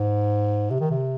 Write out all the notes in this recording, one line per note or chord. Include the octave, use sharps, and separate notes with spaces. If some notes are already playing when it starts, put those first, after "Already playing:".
Already playing: G#2
C3
D#3
C3